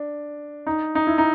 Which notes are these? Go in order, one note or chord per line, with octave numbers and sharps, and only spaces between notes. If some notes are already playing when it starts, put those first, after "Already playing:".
Already playing: D4
D#4
D#4
E4
D#4